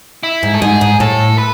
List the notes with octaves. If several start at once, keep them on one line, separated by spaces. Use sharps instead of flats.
E4
G#2
A4
G#2 G#4
G#2
A2 A4
B4